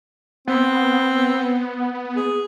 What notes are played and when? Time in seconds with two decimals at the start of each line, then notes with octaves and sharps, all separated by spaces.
0.48 B3 C4
2.16 G#4